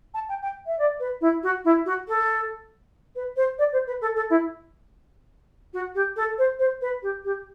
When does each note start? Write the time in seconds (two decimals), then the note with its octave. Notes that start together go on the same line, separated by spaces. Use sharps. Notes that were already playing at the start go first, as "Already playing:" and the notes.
0.14 A5
0.28 G5
0.42 G5
0.66 E5
0.78 D5
0.99 B4
1.21 E4
1.43 F#4
1.64 E4
1.85 F#4
2.08 A4
3.15 B4
3.36 C5
3.58 D5
3.72 C5
3.87 B4
4.01 A4
4.16 A4
4.30 E4
5.73 F#4
5.94 G4
6.16 A4
6.38 C5
6.59 C5
6.81 B4
7.02 G4
7.24 G4